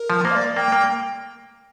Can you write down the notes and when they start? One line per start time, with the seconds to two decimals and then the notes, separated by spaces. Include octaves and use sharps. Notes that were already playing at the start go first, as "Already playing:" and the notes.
Already playing: A#4
0.10 F3
0.25 A#3 C5
0.31 F5
0.35 D5
0.56 A#3 G5
0.72 A#3